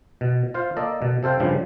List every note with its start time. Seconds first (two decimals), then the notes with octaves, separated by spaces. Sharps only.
0.21 B2
0.54 F4 C5 F5
0.77 A#3 A4 D5 D#5
1.02 B2
1.23 C3 A4 C5 F5 G5
1.40 G2 C#3 F3 G3